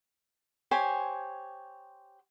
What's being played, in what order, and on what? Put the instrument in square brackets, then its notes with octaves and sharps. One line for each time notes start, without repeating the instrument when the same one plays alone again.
[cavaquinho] G4 C5 C#5 G#5